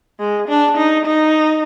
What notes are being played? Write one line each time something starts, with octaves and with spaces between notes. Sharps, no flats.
G#3
D4
D#4
D#4